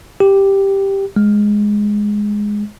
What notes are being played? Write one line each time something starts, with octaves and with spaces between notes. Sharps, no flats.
G4
G#3